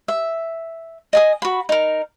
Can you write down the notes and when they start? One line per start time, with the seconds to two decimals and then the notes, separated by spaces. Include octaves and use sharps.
0.08 E5
1.13 D#5 G#5 D#6
1.42 F#4 B5
1.69 D#4 A#4